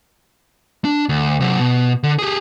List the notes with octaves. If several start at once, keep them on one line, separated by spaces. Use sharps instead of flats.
D4
D2
C3 F#3
B2
D3
G4 G#4